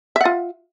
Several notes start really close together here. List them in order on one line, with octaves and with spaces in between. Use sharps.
E5 F#5 F4